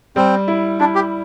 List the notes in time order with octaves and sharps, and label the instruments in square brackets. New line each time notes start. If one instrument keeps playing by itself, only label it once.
[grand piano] G3 [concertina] C4
[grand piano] E4
[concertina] D4 [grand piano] E4
[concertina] G4